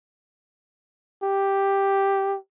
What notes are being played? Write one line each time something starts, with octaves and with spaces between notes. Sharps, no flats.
G4